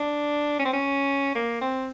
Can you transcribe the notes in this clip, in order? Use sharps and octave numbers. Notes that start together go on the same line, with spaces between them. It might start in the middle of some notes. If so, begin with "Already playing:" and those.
Already playing: D4
C#4
C4
C#4
A#3
C4